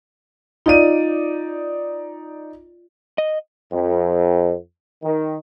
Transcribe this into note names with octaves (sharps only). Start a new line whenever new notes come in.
D#4 F4 D5 D#5 F5 D#7
D#5
F2
D#3